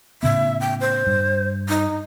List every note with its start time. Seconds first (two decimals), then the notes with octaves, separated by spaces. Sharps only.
0.23 A2 C#3 B3 E5
0.61 G5
0.81 C5
1.07 G2
1.69 D#4